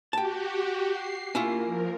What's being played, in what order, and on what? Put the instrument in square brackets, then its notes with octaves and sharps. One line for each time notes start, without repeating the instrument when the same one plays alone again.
[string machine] F#4 G4 [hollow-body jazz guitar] G5 A5
[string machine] C7
[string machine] A#3 [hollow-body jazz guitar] C#4 E4 F4
[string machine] F3 A#4